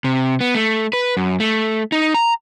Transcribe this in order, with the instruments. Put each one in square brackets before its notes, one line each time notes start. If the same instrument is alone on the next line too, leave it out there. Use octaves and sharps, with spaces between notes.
[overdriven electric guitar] C3
B3
A3
B4
F#2
A3
D#4
A#5